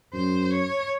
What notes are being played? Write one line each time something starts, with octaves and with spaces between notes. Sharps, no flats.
F#2 C5
C#5